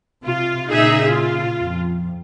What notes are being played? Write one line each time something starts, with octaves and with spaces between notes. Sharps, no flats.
C3 F4
A#2 C#3 D#4 G#4 E5
F4
F2